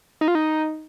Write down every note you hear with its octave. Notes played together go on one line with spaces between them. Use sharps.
D#4
F4
D#4